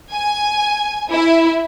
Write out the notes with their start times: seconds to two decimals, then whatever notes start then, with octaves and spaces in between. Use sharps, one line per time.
0.11 G#5
1.11 E4